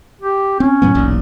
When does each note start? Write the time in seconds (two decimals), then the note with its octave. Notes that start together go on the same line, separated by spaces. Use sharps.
0.22 G4
0.60 C4 C#4
0.82 A2 F#3 B3
0.95 E1 B1 A#2